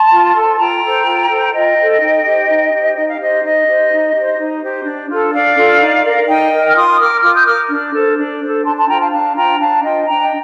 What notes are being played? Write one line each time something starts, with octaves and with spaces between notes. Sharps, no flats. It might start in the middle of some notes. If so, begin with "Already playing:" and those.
Already playing: A5 C6
F4
A4 C5
F4 G5 A#5
A4 C5
F4
A4 C5
F4 D#5 G5
A4 C5
D#4
G4 C5
D#4
G4 C5
D#4 D#5
F5
G4 C5 D#5
D#4 D#5
G4 C5
D#4
G4 C5
D#4
G4 C5
D4
F4 A4
D4 D5 F5
F4 A4
D#4
A#4
D#4 D#5 G5
A#4
F6
F4 C6 D#6
A#4 D6 F6
F4 D6 F6
D#6 G6
A#4 D6 F6
D4
A4 C5
D4
A4 C5
D4 A5 C6
A5 C6
F4 C5 G5 A#5
F5 A5
D4 F5 A5
F4 C5 G5 A#5
D4 F5 A5
F4 C5 D#5 G5
D4 G5 A#5
D#5 G5